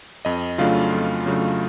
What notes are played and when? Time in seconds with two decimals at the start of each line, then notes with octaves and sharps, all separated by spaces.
0.25 F2 D#5
0.58 C#3 F#3 A3 D4 F4 F5
0.92 F2
1.26 C#3 F#3 A3 D4